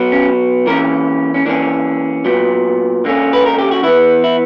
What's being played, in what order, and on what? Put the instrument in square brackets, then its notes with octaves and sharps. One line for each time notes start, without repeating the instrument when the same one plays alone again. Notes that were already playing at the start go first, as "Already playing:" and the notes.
Already playing: [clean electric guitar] B2 F#3 B3
C#4
E3 A#3 C#4 A#4
C#4
E3 A#3 C#4 D4
A#2 F#3 B3
D3 A#3 C#4
B4
A#4
G4
F#4
E3 B3 E4
E4